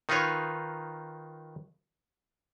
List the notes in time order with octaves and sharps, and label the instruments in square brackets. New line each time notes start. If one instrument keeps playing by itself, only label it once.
[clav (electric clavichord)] D#3 D#4 F4 B4 C#5